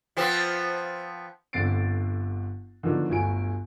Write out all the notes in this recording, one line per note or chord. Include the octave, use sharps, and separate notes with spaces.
F3 B3 C4
G1 D3 C4 A6 C7 D7
D3 D#3 F3 F#3 B3 D4
G1 D2 F#3 G#5 D7